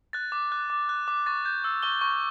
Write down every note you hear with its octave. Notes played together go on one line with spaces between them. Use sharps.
F#6 A6
D6
F#6
D6
F#6
D6
C#6 A6
G6
E6
C#6 G7
C#6